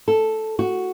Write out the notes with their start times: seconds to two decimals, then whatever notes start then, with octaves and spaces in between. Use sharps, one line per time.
0.08 A4
0.59 F#4